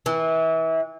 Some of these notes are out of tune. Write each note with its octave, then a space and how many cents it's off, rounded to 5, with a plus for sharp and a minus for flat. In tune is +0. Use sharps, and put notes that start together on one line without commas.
E3 -30